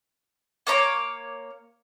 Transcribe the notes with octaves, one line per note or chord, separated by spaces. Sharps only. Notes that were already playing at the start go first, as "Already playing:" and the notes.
A#3 C#5 A#5 D6